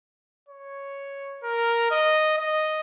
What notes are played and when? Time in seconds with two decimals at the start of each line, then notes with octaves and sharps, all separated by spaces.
0.49 C#5
1.44 A#4
1.91 D#5
2.38 D#5